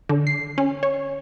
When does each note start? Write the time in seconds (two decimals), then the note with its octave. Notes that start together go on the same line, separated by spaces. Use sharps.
0.09 D3
0.27 C7
0.58 C#4
0.83 C#5